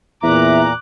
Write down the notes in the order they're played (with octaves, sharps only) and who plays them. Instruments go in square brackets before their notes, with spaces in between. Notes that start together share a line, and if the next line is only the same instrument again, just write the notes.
[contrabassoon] E2 [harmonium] A#2 A#5 [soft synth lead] E5 [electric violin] D6 F#6